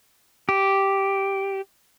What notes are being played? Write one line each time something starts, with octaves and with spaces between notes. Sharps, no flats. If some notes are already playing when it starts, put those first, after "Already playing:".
G4